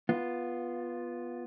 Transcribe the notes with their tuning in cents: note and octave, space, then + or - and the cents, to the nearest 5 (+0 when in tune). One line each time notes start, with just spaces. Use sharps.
B3 -10 F4 +0